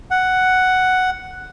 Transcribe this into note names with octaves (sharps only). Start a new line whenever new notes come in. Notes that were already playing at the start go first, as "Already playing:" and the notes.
F#5